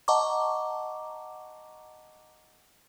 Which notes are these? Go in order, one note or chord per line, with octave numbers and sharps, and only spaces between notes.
D#5 F#5 A5 A#5 C#6 D6